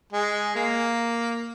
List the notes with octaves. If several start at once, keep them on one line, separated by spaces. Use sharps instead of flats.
G#3
A#3